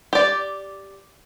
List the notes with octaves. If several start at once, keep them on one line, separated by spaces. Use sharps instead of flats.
G4 D5